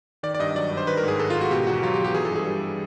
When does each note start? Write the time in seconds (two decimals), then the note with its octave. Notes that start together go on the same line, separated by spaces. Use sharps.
0.23 D#3 D5
0.34 D5
0.39 G2 D#5
0.55 F#3 D5
0.71 G2
0.77 C5
0.87 D#3 B4
0.97 A#4
1.03 G#2 G#4
1.19 G#3 A4
1.30 G#2 F4
1.41 F#4
1.51 B2 G4
1.67 E2 F#4
1.83 F#3 F4
1.94 G4
1.99 E2
2.04 G4
2.14 E3 G#4
2.25 A4
2.31 G2 G#4
2.47 G3